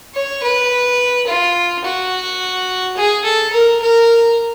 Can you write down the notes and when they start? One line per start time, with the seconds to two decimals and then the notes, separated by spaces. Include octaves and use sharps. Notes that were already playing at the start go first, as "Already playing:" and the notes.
0.14 C#5
0.43 B4
1.27 F4
1.84 F#4
2.96 G#4
3.24 A4
3.52 A#4
3.82 A#4